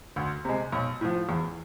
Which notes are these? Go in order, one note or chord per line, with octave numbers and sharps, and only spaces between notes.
D2
C3 G#3
B1
A2 F3
E2